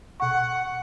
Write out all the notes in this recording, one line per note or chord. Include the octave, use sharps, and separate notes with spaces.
B2 F#5 C#6